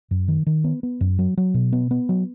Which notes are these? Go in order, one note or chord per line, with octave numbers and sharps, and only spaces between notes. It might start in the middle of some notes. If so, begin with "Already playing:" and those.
F#2
D#3
D#3
B3
B3
F#2
F#3
F#3
B2
B3
B3
F#3